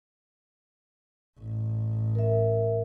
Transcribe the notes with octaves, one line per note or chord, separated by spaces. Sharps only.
A1
A#4 E5